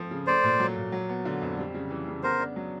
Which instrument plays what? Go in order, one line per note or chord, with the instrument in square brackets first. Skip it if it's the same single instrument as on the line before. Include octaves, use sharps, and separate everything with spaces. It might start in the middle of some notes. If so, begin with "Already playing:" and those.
Already playing: [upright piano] F3 A3 C4
C#3
[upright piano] A3 [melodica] C5 D5
[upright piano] A#2
F#3
A#2
F#3
B3
D3
F2
G3
C#3
E3
C#3
[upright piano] B3 [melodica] A#4 C5
[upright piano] D4
F#3